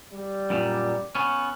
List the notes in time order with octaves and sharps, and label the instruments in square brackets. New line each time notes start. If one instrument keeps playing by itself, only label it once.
[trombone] G3
[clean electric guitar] F#2 A#2
B3 C#4